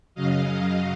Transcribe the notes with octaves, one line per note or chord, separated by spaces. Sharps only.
F#2 C#3 F#3 D#5 F5